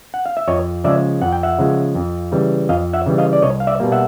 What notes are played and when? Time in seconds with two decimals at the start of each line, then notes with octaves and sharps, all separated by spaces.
0.14 F#5
0.26 F5
0.37 E5
0.48 F2 C#5 D#5
0.84 C#3 F3 G#3 D5 E5
1.22 F2 F#5
1.32 G5
1.43 E5 F#5
1.59 C#3 F3 G#3
1.95 F2
2.32 C#3 E3 G3
2.69 F2 D#5 F5
2.93 E5 F#5
3.06 C#3 E3 G3
3.18 D#5 F5
3.33 D5
3.42 C2 C#5 D#5
3.60 F5
3.67 D5 E5
3.80 B2 G3 A#3
3.92 E5 F#5